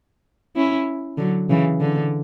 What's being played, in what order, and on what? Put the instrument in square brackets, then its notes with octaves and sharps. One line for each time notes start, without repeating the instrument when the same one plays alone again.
[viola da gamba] C#4 E4
D3 F#3
C#3 E3
D3